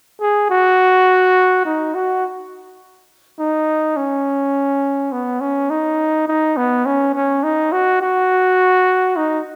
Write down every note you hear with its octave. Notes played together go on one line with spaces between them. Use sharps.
G#4
F#4
D#4
F#4
D#4
C#4
B3
C#4
D#4
D#4
B3
C#4
C#4
D#4
F#4
F#4
D#4